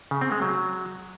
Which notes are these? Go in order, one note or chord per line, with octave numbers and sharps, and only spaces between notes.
C#3
C4
G#3
F#3